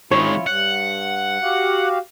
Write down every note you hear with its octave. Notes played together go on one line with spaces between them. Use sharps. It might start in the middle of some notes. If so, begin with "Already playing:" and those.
D#3 G#3 C#4 E4 F4 C#5
G2 F#5
F#4 G4 F5